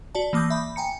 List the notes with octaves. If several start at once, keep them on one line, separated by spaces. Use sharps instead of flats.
F#4 D5 A5
E3 A#3 D6 D#6 G6
E5 B5
G5 G#5 A#5 C#7